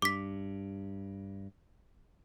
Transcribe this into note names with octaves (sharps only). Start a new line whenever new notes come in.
G2 D6 B6